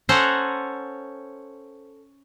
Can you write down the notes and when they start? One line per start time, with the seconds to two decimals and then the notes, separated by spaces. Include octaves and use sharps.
0.09 C#4 A4 C5 F#5 G#5 A#5